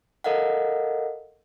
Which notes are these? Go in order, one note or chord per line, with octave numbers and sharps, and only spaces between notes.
A4 A#4 D#5 F5 F#5